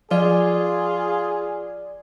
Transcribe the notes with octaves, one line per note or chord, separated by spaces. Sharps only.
F3 F4 G#4 D5